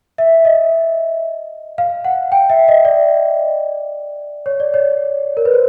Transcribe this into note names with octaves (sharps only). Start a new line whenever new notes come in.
E5
D#5
F5
F#5
G5
E5
D#5
D5
C#5
D5
C#5
A#4
B4
C5